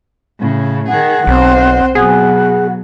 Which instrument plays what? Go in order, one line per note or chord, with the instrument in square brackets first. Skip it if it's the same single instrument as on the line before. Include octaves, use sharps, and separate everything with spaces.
[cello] A2 C#3
[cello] D#3 G#4 [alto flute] F#5
[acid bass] B1 [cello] C4 C5
[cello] B2 F#3 [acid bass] G#4 [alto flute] F#5